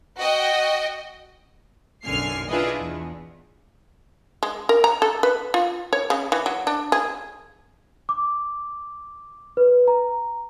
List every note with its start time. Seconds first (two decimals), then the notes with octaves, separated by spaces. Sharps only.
0.19 F#4 D#5 G5
2.04 B1 F#2 D3 G#5 F6 C7
2.48 D4 E4 F4 G#4 B4 D#5
2.79 E2
4.43 G#3
4.69 A#4
4.84 A#5
5.02 A4
5.23 B4
5.54 F4
5.93 C#5
6.10 C#3
6.32 E3
6.46 F#3
6.67 D4
6.92 G#4
8.09 D6
9.57 B4
9.88 A#5